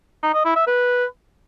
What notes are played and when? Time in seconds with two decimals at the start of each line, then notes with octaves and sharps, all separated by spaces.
0.23 D#4
0.34 D#5
0.45 E4
0.56 E5
0.67 B4